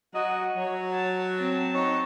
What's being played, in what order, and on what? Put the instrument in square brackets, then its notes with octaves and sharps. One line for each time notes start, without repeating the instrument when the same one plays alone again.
[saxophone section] F#3 D#5 [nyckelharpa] F#4
[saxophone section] F#3 [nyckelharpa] C#5
[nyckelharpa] C#5 A5
C4 A5
[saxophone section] D#4 F#4 C#5